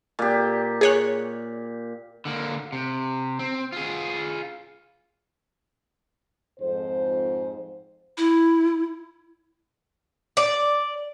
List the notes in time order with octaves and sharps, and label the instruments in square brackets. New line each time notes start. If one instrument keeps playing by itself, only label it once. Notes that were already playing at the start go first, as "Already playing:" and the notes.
[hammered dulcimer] A#2 G4
[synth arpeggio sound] G#4 C#5 F#6
[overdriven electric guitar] D3 A#3
C3
C4
F4 G#4
[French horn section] F2 G#2 C5
[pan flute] E4
[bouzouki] D5